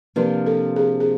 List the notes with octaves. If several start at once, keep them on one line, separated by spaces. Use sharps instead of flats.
C3 F3 A#3 D4 F4 B4
A4
G#4
G#4